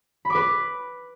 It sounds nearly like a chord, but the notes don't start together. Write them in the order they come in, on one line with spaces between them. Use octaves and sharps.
B5 D6 B4